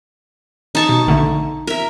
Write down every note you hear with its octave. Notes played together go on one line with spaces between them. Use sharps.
D#4 A5 C#6
B2
A#1 D3 A3
A#4 E5